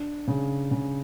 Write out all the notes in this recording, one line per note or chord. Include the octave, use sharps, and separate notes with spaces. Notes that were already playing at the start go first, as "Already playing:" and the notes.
Already playing: D4
C#3
C#3